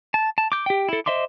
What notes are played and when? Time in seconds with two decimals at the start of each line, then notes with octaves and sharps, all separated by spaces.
0.14 A5
0.38 A5
0.52 D6 G6
0.66 G4 G5
0.89 E4 A4
1.06 C5 D#5 E5 C6 D6